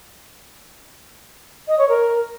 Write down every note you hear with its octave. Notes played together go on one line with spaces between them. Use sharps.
D#5
C#5
A#4